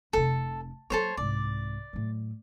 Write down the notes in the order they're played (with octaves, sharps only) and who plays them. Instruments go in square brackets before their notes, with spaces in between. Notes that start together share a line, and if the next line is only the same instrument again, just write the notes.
[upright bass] F1 C3 [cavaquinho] A4
[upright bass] F#3 A#3 [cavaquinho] A4 C5 C#5
[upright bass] C2 G#2 [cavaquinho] D5
[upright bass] A2 F#3